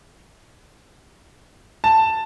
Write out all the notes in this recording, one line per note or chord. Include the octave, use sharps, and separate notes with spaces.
A5